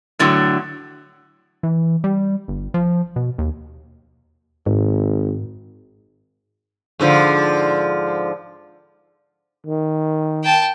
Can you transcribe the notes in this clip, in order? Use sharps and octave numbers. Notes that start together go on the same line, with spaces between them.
A2 D3 F#3
E3
G3
G1
F3
B2
D#2
G#1 G#2
G#2 D3 F3
D#3
G5 A5